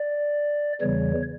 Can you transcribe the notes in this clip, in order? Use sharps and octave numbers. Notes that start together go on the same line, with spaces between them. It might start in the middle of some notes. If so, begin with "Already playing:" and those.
Already playing: D5
E2 C#3 E3 G3 C#5